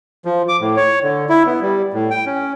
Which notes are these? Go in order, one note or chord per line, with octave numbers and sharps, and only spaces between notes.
F3
D6
A2
C#5
D3
E4
B3
G3
A2
G5
C#4